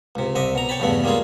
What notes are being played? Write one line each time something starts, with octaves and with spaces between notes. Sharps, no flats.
C#2 C3
C2 C3 D#5 E5
B2 A#5
C#5 G5 A5 B5
E2 G2 C#3 A3 B3
G3 G#3 A#3 C#4 F4 G#4